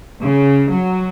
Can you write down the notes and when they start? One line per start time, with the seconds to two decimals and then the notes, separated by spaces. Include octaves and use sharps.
0.23 C#3
0.72 F#3